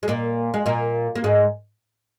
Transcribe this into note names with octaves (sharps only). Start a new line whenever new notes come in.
G#3
A#2 A#3
G#3
A#2 A#3
A#3
G#2 G#3